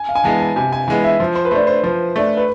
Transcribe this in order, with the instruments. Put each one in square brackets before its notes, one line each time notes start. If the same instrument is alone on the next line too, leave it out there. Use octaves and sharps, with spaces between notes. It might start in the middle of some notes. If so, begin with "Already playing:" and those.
Already playing: [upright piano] G#5
F5
G#5
[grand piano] E3 G#3 B3 [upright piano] A5
[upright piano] A5
[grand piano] C3 [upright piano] G#5
[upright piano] G#5
[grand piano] E3 G#3 B3 [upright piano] G#5
[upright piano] E5
[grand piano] F3 [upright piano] C5
[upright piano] C5
B4
[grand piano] A3 D4 [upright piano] C5
[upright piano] C5
[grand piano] F3 [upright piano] C5
[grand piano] A3 D4
[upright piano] B4